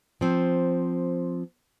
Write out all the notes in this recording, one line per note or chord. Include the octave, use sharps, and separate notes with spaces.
F3 C4